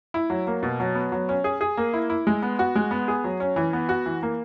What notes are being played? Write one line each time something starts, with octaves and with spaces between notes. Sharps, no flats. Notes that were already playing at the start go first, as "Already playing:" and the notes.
E4
F#3
A#3
B2
F#3
B3
F#3
C#4
G#4
G#4
A#3
E4
E4
G#3
B3
F#4
G#3
B3
G#4
F#3
C#4
E3
B3
F#4
E3
A#3